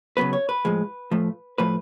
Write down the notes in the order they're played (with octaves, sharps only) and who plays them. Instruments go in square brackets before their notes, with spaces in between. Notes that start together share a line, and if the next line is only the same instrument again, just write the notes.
[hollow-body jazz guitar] C#3 F#3 B3 B4
C#5
B4
A2 F3 G#3
A2 F3 A3
A2 F3 A3 B4